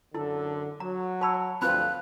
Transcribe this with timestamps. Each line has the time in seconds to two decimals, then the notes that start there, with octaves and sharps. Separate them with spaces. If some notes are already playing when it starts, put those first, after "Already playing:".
0.15 F#2 D3 E4 A4
0.80 F#3 A#5
1.21 C#5 A5 B5 E6
1.62 D2 G2 F3 C4 F4 B4 B5 F#6